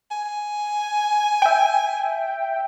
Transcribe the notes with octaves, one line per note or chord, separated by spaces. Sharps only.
G#5
E5 G5